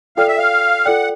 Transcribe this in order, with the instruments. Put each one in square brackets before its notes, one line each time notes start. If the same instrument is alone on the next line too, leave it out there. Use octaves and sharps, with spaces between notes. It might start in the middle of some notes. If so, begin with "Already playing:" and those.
[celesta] F4 A4 D5 G5 [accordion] F5
[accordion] E5
F5
[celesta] F4 A4 D5 G5 [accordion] F#5